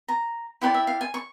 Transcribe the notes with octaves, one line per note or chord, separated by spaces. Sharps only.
A#5
E4 G4 B4 D5 F#5
E5
F5
G#5
C#6